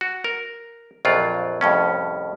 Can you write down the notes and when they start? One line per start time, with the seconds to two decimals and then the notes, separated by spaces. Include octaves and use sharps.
0.01 F#4
0.24 A#4
1.05 A#1 F2 F#3 F4 D5
1.61 C2 F2 A2 C#4